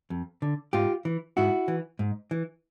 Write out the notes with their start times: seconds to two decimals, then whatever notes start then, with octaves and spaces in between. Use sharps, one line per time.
0.10 F2
0.42 D3
0.73 G#2 F4 G4
1.05 E3
1.37 G#2 E4 F#4
1.68 E3
1.99 G#2
2.31 E3